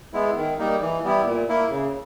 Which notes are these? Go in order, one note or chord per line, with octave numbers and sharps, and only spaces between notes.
G#3 B3 E4
D#3
G3 A#3 D#4
E3
G3 B3 E4
A#2
A#3 E4
C#3